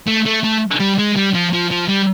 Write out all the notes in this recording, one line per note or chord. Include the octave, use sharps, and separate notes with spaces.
A3
A3
A3
G3
G#3
G3
F3
F3
F3
G3